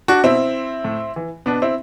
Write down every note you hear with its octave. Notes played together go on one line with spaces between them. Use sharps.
D4 F#4
B2 C4 E4
A2
E3
B2 B3 D4
C4 E4